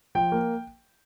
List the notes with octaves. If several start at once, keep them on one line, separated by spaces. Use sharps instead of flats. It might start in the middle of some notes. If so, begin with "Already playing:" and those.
F3 G5
A#3